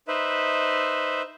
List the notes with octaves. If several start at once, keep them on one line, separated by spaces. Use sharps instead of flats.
D#4 B4 C5 E5